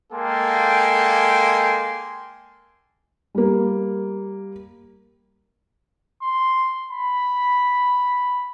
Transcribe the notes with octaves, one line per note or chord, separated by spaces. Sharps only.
G#3 A#3 A4 G5 G#5 C6
G3 A#3
C6
B5